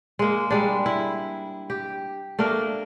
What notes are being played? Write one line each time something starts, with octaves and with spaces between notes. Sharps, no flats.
G#3 A#3
G3 G#3 D4
E4
G4
A3 A#3 D4 A#4